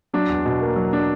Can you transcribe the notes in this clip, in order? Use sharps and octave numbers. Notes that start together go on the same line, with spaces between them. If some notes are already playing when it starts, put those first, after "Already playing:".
F#3 D4
E2
B2
A#3
F#3
D4